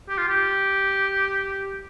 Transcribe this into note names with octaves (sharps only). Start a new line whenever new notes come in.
G4
F4
G4